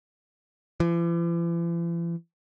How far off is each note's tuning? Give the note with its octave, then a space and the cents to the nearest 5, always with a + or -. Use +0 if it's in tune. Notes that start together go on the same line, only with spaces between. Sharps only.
E3 +45